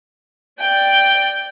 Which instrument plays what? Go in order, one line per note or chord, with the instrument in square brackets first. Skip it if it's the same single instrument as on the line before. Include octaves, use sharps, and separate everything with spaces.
[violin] D5 G5